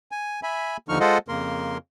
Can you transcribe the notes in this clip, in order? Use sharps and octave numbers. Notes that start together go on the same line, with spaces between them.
G#5
E5 G#5 B5
D#2 D3 F3 D#4 C#6 F6
G#3 F4 A4 C5 D#5 F#5
F2 C#3 A#3 A#4 C6